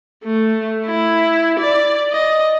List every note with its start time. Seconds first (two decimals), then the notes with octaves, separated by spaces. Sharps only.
0.24 A3
0.87 E4
1.60 D5
2.12 D#5